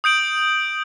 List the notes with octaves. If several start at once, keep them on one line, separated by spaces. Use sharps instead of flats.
D#6 G6 D7 F#7